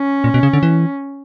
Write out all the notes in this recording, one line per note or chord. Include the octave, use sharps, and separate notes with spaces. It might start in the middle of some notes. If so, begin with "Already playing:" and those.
Already playing: C#4
A#2
B2
C#3
D3
E3